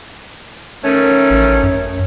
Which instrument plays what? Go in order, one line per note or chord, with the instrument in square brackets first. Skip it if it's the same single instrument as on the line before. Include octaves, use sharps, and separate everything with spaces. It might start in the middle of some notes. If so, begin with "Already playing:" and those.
[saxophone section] D#3 A3 C#4
[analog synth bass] A1
F#2